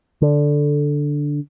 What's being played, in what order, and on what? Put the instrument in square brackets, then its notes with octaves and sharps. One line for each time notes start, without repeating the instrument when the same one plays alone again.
[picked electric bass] D3